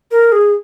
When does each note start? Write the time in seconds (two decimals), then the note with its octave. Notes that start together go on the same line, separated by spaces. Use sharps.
0.11 A#4
0.32 G#4